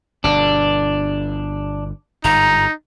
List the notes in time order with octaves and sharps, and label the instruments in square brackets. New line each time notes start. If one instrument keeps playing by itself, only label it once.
[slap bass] G1 B2 [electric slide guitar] D4
[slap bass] G1 G#2 [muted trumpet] D#4 [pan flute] A#5